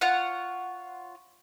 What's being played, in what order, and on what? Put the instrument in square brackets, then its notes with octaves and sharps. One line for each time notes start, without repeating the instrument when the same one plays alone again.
[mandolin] F4 C#5 F#5